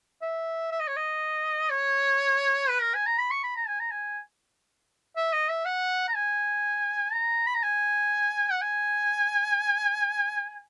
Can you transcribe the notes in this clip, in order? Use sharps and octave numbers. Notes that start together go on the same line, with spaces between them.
E5
E5
D#5
C#5
D#5
C#5
B4
A#4
G#5
A#5
B5
C#6
B5
A#5
G#5
A#5
G#5
E5
D#5
E5
F#5
A#5
G#5
A#5
B5
A#5
G#5
F#5
G#5